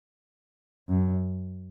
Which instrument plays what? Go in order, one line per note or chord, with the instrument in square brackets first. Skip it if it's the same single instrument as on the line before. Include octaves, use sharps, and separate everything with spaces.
[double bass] F#2